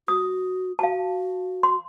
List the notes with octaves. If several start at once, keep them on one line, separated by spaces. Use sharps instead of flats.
F#4 D#6
F#4 F5 A5
C6